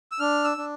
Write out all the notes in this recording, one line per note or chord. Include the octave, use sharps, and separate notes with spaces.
E6
D4 F6
E6
D4